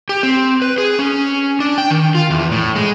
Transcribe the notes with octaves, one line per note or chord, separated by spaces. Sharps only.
G4
C4
B4
G#4
C#4
D4
G5
D#3
F4
E2
A2
G#3